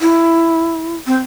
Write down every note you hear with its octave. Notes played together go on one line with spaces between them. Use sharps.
E4
C4